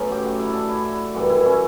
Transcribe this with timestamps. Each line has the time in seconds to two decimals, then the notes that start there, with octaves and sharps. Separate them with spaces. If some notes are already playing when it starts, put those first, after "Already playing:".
Already playing: A2 F#3 B3 C#4
0.12 G4
0.25 F#4
0.39 E4
0.52 D4
0.68 E4
1.14 F#2 E3 G3 F#4
1.30 E4
1.46 C#4